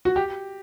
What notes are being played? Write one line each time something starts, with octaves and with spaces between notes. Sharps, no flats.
F#4
G4